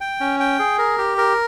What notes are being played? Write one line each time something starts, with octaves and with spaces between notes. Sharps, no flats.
G5
C#4
G5
G#4
A#4
G4
A#4